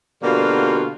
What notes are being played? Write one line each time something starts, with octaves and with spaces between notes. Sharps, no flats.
B2 D3 G3 A#3 F4 F#4